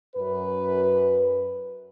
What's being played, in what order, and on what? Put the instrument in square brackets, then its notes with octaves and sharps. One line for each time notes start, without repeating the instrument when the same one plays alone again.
[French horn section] F#2 B4